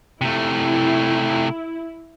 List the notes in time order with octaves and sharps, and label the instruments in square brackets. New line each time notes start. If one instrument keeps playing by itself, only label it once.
[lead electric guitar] C3 A3 [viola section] E4